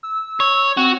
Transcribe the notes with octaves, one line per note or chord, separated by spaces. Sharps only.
E6
C#5
C4 F#4